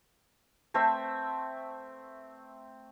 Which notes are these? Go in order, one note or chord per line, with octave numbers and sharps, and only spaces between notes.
A3 C4 C5 E5